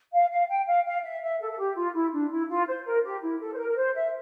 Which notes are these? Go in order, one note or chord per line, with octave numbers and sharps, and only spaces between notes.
F5
F5
G5
F5
F5
E5
E5
A4
A4
G4
F4
E4
D4
E4
F4
C5
A#4
G4
E4
A4
C5
A#4
A#4
C5
E5